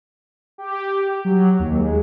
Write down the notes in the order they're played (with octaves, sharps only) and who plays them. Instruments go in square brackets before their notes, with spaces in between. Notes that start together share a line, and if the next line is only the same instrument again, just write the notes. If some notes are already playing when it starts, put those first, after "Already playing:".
[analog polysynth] G4
F#3
D#2
G#3